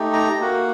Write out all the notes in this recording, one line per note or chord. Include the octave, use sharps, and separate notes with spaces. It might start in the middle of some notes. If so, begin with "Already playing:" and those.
Already playing: A3 D#4 G4
A#5
A#3 F#4